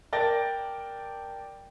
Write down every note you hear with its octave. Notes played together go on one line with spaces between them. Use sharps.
A#4 D5 G5 A5 A6 A#6